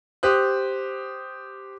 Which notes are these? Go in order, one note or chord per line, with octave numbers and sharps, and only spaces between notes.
G4 C5 D#6 F#6